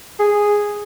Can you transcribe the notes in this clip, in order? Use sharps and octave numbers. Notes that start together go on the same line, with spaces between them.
G#4